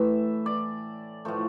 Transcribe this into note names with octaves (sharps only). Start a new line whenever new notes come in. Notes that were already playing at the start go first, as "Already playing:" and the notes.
Already playing: A2 E3 A3 E5
D5
A2 F3 A3